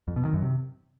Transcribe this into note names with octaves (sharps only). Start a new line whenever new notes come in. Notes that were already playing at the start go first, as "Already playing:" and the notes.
F2
B2
D#3
F#2
C3